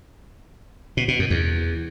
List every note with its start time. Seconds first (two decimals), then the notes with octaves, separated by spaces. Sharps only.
0.97 B2
1.08 B2
1.19 F#2
1.30 E2